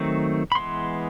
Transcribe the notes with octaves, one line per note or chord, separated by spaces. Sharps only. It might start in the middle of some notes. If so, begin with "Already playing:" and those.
Already playing: D#3 F#3 A3 C4
B5
E3 G#3 B3 C6